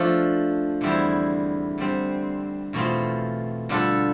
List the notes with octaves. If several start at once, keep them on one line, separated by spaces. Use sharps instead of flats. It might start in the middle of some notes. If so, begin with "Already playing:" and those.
Already playing: F3 A3 D4 F4 A4
E2 D3 G3 C4 E4
D3 G3 C4
E2 B2 A3 C4 F4
D3 G3 D4 F4 A4